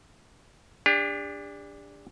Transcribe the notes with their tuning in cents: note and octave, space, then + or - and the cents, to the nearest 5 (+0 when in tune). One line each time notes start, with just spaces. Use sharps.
D4 -5 G4 +45